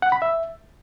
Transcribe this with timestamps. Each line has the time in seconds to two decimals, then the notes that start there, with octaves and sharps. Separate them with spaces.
0.02 F#5
0.12 B5
0.22 E5